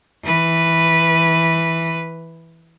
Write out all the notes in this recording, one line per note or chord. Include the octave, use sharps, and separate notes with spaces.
E3 B4